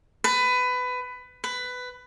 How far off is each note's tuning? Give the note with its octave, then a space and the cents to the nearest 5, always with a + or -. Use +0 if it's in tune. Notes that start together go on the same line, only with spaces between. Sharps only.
B4 +20
B4 +15